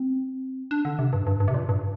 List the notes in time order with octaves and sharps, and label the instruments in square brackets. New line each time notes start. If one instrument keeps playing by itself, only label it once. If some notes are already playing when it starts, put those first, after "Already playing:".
Already playing: [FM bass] C4
D4
D3
C3
G2
G2
G2
C3
A#2
G2